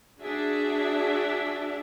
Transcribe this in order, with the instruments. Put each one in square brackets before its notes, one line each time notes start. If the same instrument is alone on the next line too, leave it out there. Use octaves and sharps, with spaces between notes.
[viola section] D4 F#4 G#4 E5